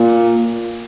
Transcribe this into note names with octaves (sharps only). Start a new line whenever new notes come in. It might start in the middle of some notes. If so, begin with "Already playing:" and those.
Already playing: A#2